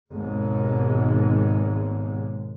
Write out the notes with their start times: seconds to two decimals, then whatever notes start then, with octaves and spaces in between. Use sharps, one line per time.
0.12 G#1 D#2 B2 G#3